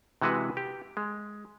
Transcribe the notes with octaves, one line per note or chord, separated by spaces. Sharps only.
C3 E3 G#3 F#4 B4
G4
G#3